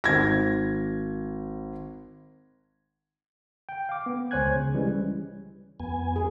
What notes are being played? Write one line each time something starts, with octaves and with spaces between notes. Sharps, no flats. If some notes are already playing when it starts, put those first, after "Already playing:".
G#1 G#6 A#6
G5
F5 D6
B3
C#2 C5 C#5 G#5 F#6 G#6
C#3
E3 G3 G#3 C#4
F2 B3 G#5
G#4